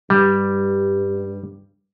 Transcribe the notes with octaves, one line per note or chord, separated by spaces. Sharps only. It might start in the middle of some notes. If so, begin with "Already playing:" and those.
G2 G3